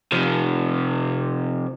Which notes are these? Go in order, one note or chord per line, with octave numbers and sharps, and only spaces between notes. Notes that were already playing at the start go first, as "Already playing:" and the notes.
C3 F3